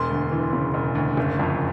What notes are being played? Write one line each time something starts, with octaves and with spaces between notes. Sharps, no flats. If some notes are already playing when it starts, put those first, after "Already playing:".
Already playing: E1 C6
D2
E3
C#3
E1
D2
F#1
F2